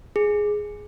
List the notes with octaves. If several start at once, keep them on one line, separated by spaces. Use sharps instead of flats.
G#4